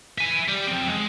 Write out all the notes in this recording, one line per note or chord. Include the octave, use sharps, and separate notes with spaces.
E5 G#5
G3
F3 C4
G#3